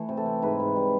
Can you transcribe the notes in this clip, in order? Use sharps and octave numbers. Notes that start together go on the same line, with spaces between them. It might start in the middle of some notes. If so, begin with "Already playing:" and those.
Already playing: E3 A3
C3
A4
C3
G#2 B4
G#2
G3